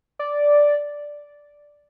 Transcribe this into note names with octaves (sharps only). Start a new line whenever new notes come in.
D5